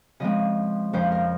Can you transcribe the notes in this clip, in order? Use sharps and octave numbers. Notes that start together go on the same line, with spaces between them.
C#3 F3 G#3 C4 D#5
F2 C#3 F3 C5
A#4